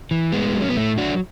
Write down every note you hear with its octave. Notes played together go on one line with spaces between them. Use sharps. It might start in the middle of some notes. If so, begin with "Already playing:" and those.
E3
A2 G#3 B3
F#3
C#4
B3
A2 A3
F#3 D4 F#4